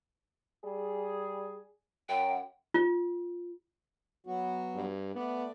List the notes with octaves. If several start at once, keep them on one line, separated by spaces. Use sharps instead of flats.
G3 G#4
F#2 G5
F4
F#3 B3 F#4
G2
A3 B3 D5